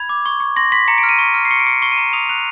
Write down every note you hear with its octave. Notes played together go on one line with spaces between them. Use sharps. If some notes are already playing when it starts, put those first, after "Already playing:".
Already playing: B5 G#6
D6
C#6
C#6
C6 A#6
C6 B6
A#5 C#7
D7
F6
D#7
C#6
F6
C7
C#6 C#7
D7
C#6 C#7
C#6 C7
D#7
A#5
D#6 F7
F#6 F7